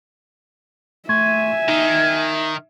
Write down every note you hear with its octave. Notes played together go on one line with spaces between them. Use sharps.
A3 E5 G#5 C6 C#6
D#3 D#4